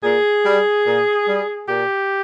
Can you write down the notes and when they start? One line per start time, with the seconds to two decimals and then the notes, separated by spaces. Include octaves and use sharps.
0.03 A#2 G#4
0.44 G3
0.85 A#2
1.27 G3
1.67 A#2 G4